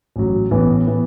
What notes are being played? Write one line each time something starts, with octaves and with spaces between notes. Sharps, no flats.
A1 A2 F#3
A1 A2 E3 B3
E3 B3